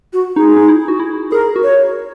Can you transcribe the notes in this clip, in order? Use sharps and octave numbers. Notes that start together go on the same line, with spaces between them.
F#4
D#4 G#4
D#4
E4
F#4
E4
G#4 A#4
F#4
C#5